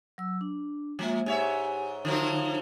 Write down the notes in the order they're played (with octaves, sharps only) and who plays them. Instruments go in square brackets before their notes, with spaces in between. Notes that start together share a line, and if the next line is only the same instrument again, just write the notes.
[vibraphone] F#3 E6
D4
[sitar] F3 [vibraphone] G#3 A#3 E5
[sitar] G#2 C#5 E5 [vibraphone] G4 G#5
[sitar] D3 F3 F#3 [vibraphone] D#4 A#5